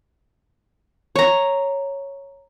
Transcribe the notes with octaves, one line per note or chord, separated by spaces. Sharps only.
C#5 A#5